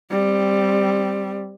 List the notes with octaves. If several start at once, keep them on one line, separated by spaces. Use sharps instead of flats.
G3 C4